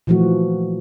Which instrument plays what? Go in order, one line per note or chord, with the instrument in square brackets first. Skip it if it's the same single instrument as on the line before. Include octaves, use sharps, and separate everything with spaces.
[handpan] A#2 E3 F3 A3 F#4